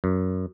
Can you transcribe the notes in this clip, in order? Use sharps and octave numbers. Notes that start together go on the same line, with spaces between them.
F#2